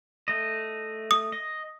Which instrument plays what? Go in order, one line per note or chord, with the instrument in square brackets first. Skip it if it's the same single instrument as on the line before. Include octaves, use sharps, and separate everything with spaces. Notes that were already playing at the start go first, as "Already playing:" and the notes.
[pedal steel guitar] A3 D#5
[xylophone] D#6
[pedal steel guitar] D#5